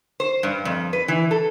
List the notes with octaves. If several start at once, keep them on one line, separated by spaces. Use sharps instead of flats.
C5
G2
F2
B4
E3
A4